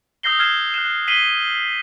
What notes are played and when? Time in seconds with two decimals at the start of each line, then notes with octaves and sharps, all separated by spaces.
0.23 D#6 E6 G6 A#6 C7 G7
0.39 F6 G#6 C7 E7
0.74 F#6 E7
1.08 B6 C7 D#7 E7 F#7 G7